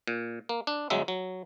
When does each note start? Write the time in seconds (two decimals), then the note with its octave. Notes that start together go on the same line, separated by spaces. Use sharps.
0.07 A#2
0.49 A#3
0.67 D4
0.90 G1 F#3 G#3 E5
1.08 F#3